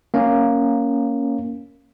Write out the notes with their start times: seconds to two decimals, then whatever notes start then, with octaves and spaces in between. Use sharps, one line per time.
0.14 A#3 C#4